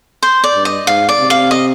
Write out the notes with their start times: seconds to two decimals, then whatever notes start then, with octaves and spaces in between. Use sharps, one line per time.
0.23 C5
0.44 D5
0.54 G2
0.65 D#5
0.86 G#2 F5
1.09 D5
1.20 C3
1.30 F5
1.51 D#5